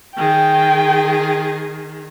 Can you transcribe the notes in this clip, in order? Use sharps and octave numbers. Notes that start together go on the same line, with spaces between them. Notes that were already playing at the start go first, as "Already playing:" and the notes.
D#3 G#4 G5